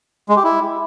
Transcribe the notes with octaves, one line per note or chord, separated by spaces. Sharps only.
G#3
G4
E4